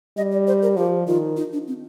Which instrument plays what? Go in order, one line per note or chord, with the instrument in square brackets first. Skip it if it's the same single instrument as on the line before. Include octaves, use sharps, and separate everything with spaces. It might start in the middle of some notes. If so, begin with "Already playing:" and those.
[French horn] G3 [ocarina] D#5
[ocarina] D5
C5
A#4
[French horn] F3 [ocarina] G4
[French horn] D#3 [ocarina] F4
[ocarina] D#4
D4
C4